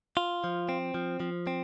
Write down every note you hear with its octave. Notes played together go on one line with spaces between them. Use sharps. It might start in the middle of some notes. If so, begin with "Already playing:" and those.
F4
F3
C4
F3
F3
C4